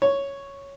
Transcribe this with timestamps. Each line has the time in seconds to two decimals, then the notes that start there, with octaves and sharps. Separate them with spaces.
0.02 C#5